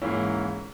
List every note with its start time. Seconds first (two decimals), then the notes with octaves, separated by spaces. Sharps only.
0.02 G#2 E3 A#3 C#4 E4